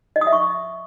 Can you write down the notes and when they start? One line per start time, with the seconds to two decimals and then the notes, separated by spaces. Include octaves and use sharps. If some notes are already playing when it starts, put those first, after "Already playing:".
0.16 D#5
0.21 D#6
0.27 E5
0.33 C#6